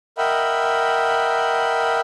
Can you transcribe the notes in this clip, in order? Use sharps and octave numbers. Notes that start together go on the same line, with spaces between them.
A#4 D#5 E5 F#5 G5 B5